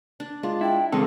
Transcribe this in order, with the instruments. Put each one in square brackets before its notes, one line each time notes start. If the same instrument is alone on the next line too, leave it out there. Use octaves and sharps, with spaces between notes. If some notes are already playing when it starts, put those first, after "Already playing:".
[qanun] D4
[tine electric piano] G#3 F4 [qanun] D4
[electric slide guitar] E4 [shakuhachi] G5
[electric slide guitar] C#3 E3 G#3 [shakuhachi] C4 [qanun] D4 [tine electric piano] A4